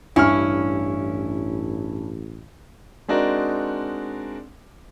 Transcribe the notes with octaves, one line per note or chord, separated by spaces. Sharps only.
A1 G2 C#4 E4 C#6 F6
G#3 C4 D4 D#4 F#4 A#4